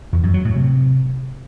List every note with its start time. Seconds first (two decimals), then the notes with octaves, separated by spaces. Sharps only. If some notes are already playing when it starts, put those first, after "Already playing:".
0.13 E2
0.23 F#2
0.34 F#3
0.45 A2
0.55 C3